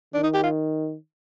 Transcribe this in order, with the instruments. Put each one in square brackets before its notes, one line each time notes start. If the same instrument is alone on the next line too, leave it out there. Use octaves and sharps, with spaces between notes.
[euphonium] D#3 [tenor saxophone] D4
[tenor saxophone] D#4
G4
F4